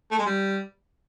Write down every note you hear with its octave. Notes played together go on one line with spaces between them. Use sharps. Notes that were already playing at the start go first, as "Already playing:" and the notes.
A3
G#3
G3